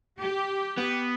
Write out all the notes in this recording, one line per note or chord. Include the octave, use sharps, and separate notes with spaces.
G4
B3